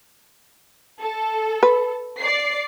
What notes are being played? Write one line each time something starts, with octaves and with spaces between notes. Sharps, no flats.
A4
B4
D5 C7